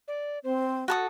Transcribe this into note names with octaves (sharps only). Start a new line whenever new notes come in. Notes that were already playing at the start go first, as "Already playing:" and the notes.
D5
C4 C5
F#4 A4 D#6